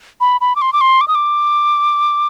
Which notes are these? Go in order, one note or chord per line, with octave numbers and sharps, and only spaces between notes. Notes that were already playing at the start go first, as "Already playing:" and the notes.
B5
B5
D6
C6
D6
C6
D6
D#6
D6